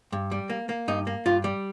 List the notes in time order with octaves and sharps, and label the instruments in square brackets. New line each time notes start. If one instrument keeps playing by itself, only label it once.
[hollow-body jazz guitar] G2
G3
A#3
A#3
G2 D#4
A#3
G2 F4
G3